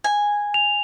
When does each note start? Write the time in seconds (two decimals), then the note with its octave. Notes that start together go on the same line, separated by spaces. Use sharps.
0.04 G#5
0.54 F7